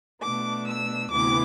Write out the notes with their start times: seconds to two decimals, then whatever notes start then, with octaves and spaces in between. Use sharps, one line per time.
0.22 B2 A3 D4 D6
0.67 E6
1.11 D2 C3 E3 B3 D6